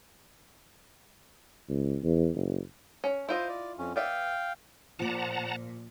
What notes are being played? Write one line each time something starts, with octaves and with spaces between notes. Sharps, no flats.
C#2
E2
F#1
C#4
E4 F4 C5 D#5
D5
F2 C#4
B3 D5 E5 F5 G5
A#2 F3 F#5 A5 A#5 D6